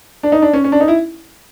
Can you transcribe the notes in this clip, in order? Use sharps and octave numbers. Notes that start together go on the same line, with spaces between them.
D4
D#4
D4
C#4
C#4
D4
D#4
E4